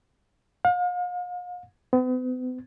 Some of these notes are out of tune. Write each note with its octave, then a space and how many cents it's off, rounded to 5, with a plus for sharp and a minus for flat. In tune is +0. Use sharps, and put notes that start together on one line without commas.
F5 +40
B3 +45